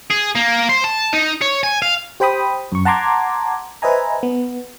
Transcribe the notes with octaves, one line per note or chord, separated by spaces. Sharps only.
G#4
A#3
C5
A5
D#4
C#5
G#5
F5
G4 C5 G5 B5 D#6
F#2 C#6
F#5 A5 A#5 C6 D6 G#6
B4 C5 D#5 E5 G#5 A#5
B3